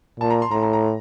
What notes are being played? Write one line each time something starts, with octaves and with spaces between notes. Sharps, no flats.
A#2 A5
A#5
C6
A2 A#5
A#5
A#5